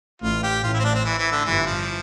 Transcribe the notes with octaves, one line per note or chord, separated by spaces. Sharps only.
A1 A2 F4
G4
A1 A2 F4
E4
C4
D4
C4
E3
E3
D3
G1 G2 E3
F3